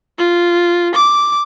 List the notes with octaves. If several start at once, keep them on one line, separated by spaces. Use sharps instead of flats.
F4
D6